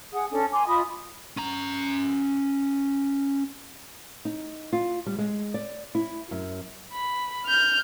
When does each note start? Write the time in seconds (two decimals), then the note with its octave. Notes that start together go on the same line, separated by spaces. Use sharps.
0.12 G#4 F#5 D#6
0.31 C#4 D4 A4
0.51 G#5 C6 D6
0.66 F4 D#5 B5 D#6
1.37 C#4 A#5
4.25 D#4
4.73 F4
5.06 G3
5.18 G#3
5.54 D5
5.95 E4
6.31 F#2
6.93 B5
7.46 F6 G6